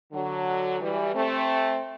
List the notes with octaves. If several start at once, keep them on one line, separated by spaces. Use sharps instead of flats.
D3 F#3
E3 G3
A3 C4